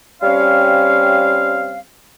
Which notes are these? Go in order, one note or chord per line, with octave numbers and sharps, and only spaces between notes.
G3 C4 C#4 C#5 F5